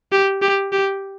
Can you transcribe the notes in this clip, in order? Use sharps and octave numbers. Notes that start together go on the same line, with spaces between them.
G4
G4
G4